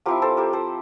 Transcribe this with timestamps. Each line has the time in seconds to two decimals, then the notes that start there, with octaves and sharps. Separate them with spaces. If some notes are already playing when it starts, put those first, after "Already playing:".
0.06 F3 C4 E4 G4 A#4
0.22 A4 C5
0.37 G4 A#4
0.53 A4 C5